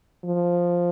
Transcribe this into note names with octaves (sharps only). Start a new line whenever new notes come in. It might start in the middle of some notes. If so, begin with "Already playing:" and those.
F3